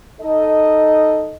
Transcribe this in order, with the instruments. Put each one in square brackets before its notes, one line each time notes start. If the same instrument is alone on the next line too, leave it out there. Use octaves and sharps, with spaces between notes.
[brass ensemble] D#4 A4 D#5